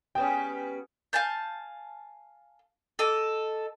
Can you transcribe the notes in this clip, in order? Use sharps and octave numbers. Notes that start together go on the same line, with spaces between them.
G3 B3 C#4 G#4 G5
F5 G#5 A5 G6
A4 D#5 D6